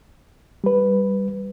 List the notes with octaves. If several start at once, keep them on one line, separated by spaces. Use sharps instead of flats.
G3 B4